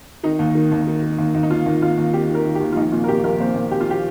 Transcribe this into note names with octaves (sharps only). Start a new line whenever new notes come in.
D#3 D#4
D#2
D#3
D#2
D#3
D#3
D#2
D#2
D#4
D#2 F4
D#2
D#2 F4
D#2
D#3 G4
D#3
A#4
D#3
G4
D#2
F4
A#1 D#4
A#2 F4
A#4
A#2 G4
A#1 A#4
A#2 C5
A#2
A#2 G4
F4
G4